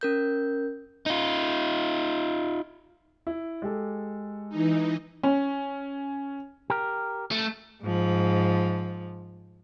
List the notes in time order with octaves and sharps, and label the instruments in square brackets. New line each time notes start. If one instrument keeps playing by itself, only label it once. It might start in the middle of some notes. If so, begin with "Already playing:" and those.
[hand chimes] C#4 A#4 G6
[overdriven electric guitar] D#4 F4
[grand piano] E4
G#3 G4 A4
[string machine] E3 D#4
[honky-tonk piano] C#4
[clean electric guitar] G4 A#4
[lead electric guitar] A3
[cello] G#2 F3